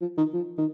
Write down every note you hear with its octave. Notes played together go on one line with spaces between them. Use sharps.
F3
D#3
F3
D#3